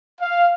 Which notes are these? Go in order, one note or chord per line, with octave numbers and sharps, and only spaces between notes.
F5